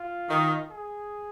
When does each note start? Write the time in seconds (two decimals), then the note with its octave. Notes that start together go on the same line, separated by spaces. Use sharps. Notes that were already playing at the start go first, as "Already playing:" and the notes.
Already playing: F4
0.29 D#3
0.70 G#4